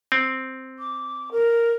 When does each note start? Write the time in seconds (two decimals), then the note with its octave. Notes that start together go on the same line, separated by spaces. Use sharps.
0.12 C4
0.78 D6
1.31 A#4